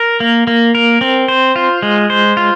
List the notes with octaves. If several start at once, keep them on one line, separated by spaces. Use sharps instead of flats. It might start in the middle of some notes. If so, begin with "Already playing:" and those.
Already playing: A#4
A#3
A#3
A#4
C4
C5
F4
G#3
C5
F4